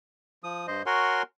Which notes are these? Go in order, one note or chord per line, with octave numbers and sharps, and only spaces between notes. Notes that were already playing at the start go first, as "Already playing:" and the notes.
F3 D#6
G2 C5 D#5
F#4 A#4 C#5 F#5 G#5 C6